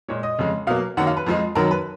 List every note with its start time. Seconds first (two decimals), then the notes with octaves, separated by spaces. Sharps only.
0.08 A#2 G#3 C#5
0.23 D#5
0.39 F2 C#3 G#3
0.67 B2 F#3 A#3 F5
0.97 F#2 D#3 F#3 A#3 F#5
1.07 F5
1.17 B4
1.26 F2 F3 G#3
1.55 F#2 D#3 F#3 A#4
1.71 B4